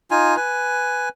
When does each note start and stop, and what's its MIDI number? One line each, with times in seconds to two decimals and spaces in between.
0.11 0.36 63
0.11 0.36 65
0.11 0.36 80
0.36 1.09 71
0.36 1.09 80